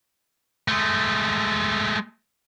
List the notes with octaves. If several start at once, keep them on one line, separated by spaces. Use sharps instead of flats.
G#3 A3